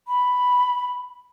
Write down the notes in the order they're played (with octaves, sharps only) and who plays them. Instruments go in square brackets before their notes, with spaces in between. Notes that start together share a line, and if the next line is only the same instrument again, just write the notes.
[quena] B5